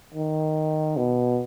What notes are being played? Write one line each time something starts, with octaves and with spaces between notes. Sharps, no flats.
D#3
B2